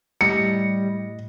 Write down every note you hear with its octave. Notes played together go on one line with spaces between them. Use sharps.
A2 G3 D#5 A#6 C#7